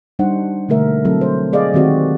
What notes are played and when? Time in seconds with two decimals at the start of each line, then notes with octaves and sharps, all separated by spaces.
0.19 G3 D4 D#4 C5 F#5
0.69 B2 D3 A3 A#4 E5
1.05 F#3 C4 E4 A4
1.21 C5
1.53 G#4 D5 D#5 F5
1.74 D#3 G#3 C4 F#4 G4 D5